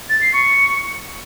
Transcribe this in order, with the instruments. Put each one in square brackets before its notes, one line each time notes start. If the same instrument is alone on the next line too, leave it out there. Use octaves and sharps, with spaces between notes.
[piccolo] A6
C7
C#6